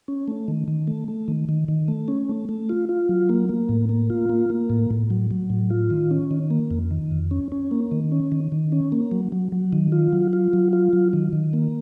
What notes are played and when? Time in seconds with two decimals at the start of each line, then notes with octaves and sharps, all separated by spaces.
0.08 C#4
0.28 A3
0.48 D#3
0.68 D#3
0.87 A3
1.08 A3
1.28 D#3
1.49 D#3
1.68 D#3
1.88 A3
2.08 C#4
2.29 A3
2.49 A3
2.69 F4
2.89 F4
3.09 F#3
3.29 A#3
3.49 A#3
3.69 A2
3.89 A#3
4.10 F4
4.29 A#3
4.50 A#3
4.70 A2
4.91 A2
5.10 F#3
5.31 F#3
5.50 A2
5.70 F4
5.90 D#3
6.11 C#4
6.31 D#3
6.50 A#3
6.71 F2
6.91 D#3
7.11 F2
7.31 C#4
7.52 C#4
7.71 A#3
7.92 D#3
8.12 C#4
8.32 D#3
8.52 D#3
8.72 C#4
8.92 A#3
9.11 F#3
9.32 F#3
9.52 F#3
9.73 D#3
9.92 F4
10.13 F#3
10.33 F4
10.53 F#3
10.73 F4
10.93 F#3
11.13 D#3
11.33 D#3
11.53 A#3